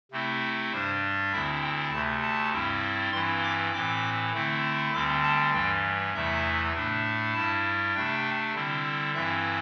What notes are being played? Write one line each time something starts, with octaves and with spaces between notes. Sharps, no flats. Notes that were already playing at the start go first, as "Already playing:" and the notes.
C3 A3 C4 E4
G2 G3 D4 C5
D2 D3 C4 E4 E5
G5
D2 C3 A3 A5
A5
G2 G3 C4 E4
G2 E3 C4 E4 C6
D6
A2 E3 C4 D6
D3 A3 C4 E4
D2 D3 G3 C4 D6
A5
G2 E3 G3 G5
E2 C3 E3 A3 E4 E5
A2 A3 D4
G2 G3 E4 A5
C3 A3 D4 G5
D3 G3 C4 E4
G2 E3 C4 E4 E5